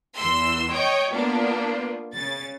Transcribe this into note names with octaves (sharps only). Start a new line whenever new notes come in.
E2 E3 C6 E6
C#5 D#5 G5 C#6
A#3 B3 D4 F4
C#3 A6